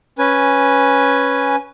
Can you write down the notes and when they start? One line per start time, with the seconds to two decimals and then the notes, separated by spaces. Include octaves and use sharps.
0.18 C#4 B4 G#5